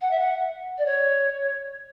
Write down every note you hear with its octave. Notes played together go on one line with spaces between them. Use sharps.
F#5
E5
F#5
D5
C#5